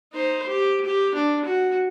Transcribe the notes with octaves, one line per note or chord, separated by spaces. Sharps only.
D#4 C5
G4
G4
D4
F#4